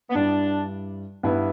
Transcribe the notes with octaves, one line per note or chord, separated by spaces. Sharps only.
B3
G2 G3 D4 E4
G2 G3 B3 E4